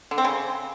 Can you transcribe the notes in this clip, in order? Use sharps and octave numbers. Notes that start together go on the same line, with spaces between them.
D3
C4
C#3